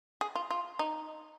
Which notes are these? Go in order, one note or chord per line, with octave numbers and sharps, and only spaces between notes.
G#4
F4
F4
D#4